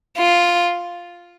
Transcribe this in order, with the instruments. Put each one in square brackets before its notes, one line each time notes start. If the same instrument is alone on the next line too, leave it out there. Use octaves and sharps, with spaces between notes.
[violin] F4